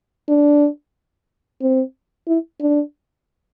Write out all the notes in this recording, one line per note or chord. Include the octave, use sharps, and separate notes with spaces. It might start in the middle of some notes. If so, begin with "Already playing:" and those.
D4
C4
E4
D4